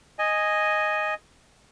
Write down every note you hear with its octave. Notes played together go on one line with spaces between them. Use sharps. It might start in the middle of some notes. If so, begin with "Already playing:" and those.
D#5 G#5